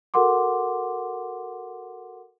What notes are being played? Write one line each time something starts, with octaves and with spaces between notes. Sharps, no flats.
F#4 A4 A#4 F#5 C6 D6